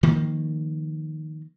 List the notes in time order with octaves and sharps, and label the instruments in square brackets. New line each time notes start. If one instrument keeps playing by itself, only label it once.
[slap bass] D#3 F3 A#3